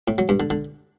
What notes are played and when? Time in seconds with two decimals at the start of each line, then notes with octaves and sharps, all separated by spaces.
0.08 A2
0.18 F#3
0.29 G2
0.40 D3
0.50 D3